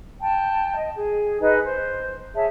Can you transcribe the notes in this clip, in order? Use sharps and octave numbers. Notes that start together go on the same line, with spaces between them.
G5 A5
D#5
G#4
D#4 G#4 B4 D#5
C5
G#4 C#5 E5 A5